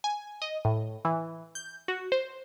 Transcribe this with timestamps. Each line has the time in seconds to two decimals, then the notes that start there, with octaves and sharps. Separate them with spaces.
0.04 G#5
0.42 D#5
0.65 A2
1.05 E3
1.55 G6
1.88 F#4
2.12 C5